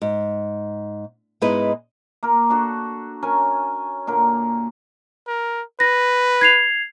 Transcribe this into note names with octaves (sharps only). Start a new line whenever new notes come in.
G#2
G#2 G#3 B3 D#4 E4 B4
A#3 A#4
D4 F#4 A4
C#4 A#4 G#5
A#2 D3 A#4
A#4
B4 A#6
G#6 C7 F7